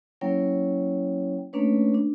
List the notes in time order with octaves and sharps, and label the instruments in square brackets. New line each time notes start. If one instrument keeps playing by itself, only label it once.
[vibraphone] F#3 A#3 C#4 E4 C#5 G5
A3 A#3 C#4 D4 B4 C#5
D4